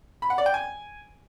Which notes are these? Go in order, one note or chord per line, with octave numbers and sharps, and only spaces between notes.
B5
F#5
D5
G5
G#5